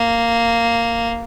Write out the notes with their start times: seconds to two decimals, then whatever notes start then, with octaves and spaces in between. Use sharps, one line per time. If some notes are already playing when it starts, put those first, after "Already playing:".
Already playing: A#3